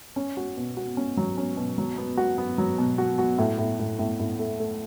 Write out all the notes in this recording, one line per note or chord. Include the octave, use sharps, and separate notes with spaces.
C#4
F#4
B2
F#4
C#4
F#3
C#4
B2
F#3
B3
F#4
B3
F#3
B2
F#4
F#4
A2
A2
A2
A2
A2
A3
A3